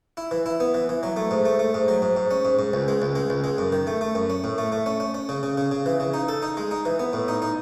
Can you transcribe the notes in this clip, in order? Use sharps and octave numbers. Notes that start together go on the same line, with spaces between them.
E4
E3
E4
B3
E3
E3
F#3
A3
G#2
A3
A3
G#2
F#3
G#2
G#2
C#4
G#2
G#2
C#2
G#3
C#2
G#3
C#2
G#3
F#2
D#3
A3
A3
F#2
C#4
A2
A3
A3
C#4
C#4
C#4
C#3
C#3
C#3
C#3
E3
C#3
D#4
A4
D#4
G#3
D#4
E3
B3
A2
D#4
D#4